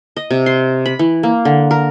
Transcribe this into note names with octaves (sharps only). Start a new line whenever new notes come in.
D#5
C3
C6
B5
E3
A#3
D3
A#4